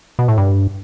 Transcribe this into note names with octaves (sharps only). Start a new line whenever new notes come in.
B2
A2
G2